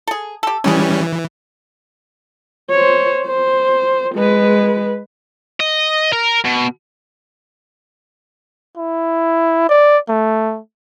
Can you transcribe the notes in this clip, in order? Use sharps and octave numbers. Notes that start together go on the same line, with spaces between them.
G#4 A4
G4 A4
E3 G3 C#4 E4 G#4
E3
C5 C#5
C5
G#3 B4
D#5
A#4
B2
E4
D5
A3